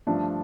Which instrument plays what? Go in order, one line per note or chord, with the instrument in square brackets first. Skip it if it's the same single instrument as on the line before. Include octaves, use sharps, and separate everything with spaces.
[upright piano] G2 D3 F3 A3 D4